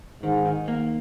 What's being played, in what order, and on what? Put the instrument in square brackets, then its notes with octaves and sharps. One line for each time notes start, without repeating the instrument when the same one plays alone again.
[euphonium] G#2 [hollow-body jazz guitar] D#3
[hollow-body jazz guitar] D#3
A#3